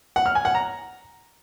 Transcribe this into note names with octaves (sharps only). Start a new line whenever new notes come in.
F#5
F6
G#5
F#5
A#5